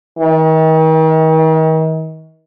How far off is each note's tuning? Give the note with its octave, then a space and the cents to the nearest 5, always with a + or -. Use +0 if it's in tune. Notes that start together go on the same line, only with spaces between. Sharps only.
D#3 +40